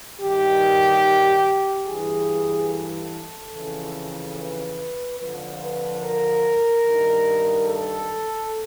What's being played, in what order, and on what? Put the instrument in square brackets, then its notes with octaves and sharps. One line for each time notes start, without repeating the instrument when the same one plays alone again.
[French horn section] G2 D#3 G4
G2 E3 G#4
A4
F2 C#3 E3
B4
F2 D3 F3 B4
B4
A#4
G2 D#3
A4